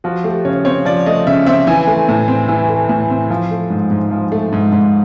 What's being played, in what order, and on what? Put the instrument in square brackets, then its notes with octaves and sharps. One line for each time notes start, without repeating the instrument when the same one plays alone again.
[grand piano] F3 F#4
A3 G4
C#3 C#5
C4 C#5
F3 D5
A3 D#5
C#3 E5
C4 E5
E3 G#5
A3
A2
C4
E3
A3
A2
C4
F3
A3
G#2
G#2
F3
A3
G#2
G#2